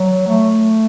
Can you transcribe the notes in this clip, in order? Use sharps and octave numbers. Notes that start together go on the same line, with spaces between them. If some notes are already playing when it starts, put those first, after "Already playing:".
Already playing: F#3
A3